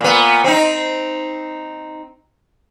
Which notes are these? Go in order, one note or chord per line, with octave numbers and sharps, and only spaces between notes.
A#2 B3
C4 D#4